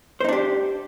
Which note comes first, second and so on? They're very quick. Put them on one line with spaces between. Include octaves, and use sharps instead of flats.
C5 D#4 D4 G4